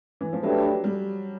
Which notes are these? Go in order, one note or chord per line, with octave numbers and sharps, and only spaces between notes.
E3
F3
F#3 A3 D4 G4 B4
G3